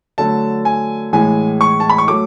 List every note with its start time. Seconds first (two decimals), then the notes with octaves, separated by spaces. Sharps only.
0.18 D3 F#3 A3 A5
0.65 G#5
1.13 A2 E3 G#3 G#5
1.61 C#6
1.80 A5
1.89 B5
1.98 C#6
2.08 F#3 A3 D6